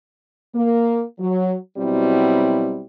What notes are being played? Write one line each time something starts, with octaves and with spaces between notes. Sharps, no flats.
A#3
F#3
B2 F#3 G3 C4 E4